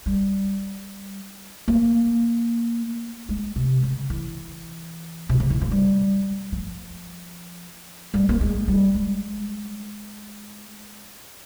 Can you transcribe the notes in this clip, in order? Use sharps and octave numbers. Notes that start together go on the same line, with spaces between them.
G3
A#3
G#3
C3
C#3
E3
C3
C#3
E3
F3
G3
F3
G3
A#3
G#3
G3
G#3